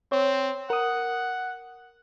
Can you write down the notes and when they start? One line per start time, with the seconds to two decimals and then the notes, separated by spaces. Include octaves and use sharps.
0.12 C4 C#5
0.70 A#4 F#5 D#6